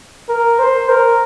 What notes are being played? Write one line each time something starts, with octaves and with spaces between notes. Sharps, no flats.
A#4
C5
A#4